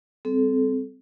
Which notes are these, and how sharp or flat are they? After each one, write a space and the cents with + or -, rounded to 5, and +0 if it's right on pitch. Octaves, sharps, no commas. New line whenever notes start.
G3 +0 C4 -20 A4 -30